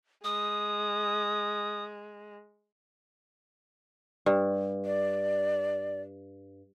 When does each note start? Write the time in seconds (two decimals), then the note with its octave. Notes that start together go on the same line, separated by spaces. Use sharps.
0.24 G#3 D#6
4.26 G2
4.85 D5